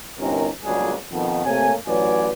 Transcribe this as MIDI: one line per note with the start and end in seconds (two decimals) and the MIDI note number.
0.19 0.47 31
0.19 0.47 48
0.19 0.47 61
0.19 0.47 63
0.19 0.47 70
0.64 0.95 31
0.64 0.95 37
0.64 0.95 46
0.64 0.95 54
0.64 0.95 62
0.64 0.95 68
1.11 1.41 41
1.11 1.41 47
1.11 1.41 51
1.45 1.73 48
1.45 1.73 57
1.45 1.73 58
1.45 1.73 73
1.45 1.73 80
1.87 2.31 33
1.87 2.31 54
1.87 2.31 71
1.87 2.31 73
1.87 2.31 74
1.87 2.31 80